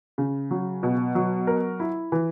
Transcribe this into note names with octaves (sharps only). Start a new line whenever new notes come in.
C#3
F#3
B2
F#3
A#4
E4
E3